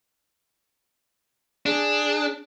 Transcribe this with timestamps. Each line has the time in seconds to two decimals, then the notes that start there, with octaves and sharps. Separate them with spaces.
1.66 D4 G#4